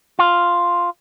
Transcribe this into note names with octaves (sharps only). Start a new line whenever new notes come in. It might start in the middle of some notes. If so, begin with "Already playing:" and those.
F4